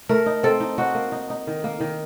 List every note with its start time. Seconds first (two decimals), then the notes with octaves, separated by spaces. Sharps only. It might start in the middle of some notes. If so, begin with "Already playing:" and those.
0.09 A3 A#4
0.26 D#4
0.43 C4 A4
0.60 D#4
0.78 D#4 F#4
0.95 A#3
1.12 D#4
1.30 D#4
1.47 D#3
1.64 A#3
1.80 D#3